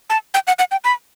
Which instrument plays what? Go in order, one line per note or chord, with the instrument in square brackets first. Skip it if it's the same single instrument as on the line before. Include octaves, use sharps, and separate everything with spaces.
[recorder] A5
G5
F#5
F#5
G5
B5